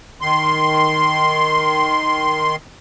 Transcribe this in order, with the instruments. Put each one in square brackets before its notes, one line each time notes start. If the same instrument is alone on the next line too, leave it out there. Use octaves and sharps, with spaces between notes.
[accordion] D#3 C6